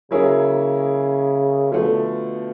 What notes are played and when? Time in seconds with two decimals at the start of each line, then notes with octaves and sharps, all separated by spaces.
0.11 C#3 F#3 A#3 C#4 E4 G#4
1.72 B2 D3 F3 A3